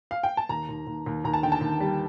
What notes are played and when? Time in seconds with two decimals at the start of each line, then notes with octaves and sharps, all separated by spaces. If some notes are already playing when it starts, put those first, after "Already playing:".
0.11 F5
0.23 G5
0.37 A5
0.49 D#2 A#5
0.69 D#2
0.87 D#2
1.06 D#2
1.24 D#2 A#5
1.34 A5
1.43 D3 G5
1.52 A5
1.61 D#2
1.80 G3